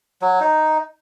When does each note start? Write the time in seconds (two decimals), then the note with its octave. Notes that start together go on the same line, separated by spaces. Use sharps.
0.22 F#3
0.40 D#4